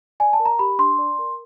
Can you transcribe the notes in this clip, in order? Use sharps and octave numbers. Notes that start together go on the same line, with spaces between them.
D5 G#5
A5
A#4
A#5
G4 B5
D4 C6
D5
A#4